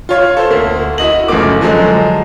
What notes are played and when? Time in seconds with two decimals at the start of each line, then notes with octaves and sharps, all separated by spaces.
0.09 F4 C#5 F5
0.37 A4 C5
0.50 D2 A#3
0.98 E4 F#4 D#5 F#7
1.28 F#1 C#3 F3 A3 A#3 D6
1.61 D3 F3 F#3 G#3